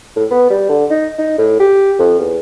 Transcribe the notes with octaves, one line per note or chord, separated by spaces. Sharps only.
A2
B3
G3
D3
D#4
D#4
A2
G4
F2
E2